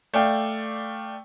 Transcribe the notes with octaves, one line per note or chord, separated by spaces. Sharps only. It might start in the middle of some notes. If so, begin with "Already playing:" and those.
A3 D5 F5 G5